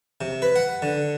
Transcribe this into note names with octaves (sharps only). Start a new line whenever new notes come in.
C3
B4
F#5
D3